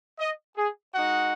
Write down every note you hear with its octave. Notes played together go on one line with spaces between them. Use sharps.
D#5
G#4
G#3 D#4 F#4 F#5